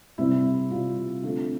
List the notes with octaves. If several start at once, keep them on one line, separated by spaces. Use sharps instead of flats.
C3 G3 C4 E4
C3 G3 C4 F4
D3 A3 C4 F4